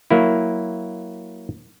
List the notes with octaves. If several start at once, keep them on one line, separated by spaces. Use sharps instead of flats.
F#3 A#3 E4